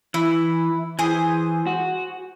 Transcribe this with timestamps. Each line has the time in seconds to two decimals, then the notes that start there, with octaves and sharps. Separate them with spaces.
0.14 E3 E4
0.99 E3 G#4 C5
1.67 F#4